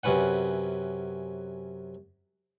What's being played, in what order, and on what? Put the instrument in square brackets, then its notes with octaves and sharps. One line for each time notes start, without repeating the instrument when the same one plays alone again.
[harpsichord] F#2 C3 C#4 B4 F#5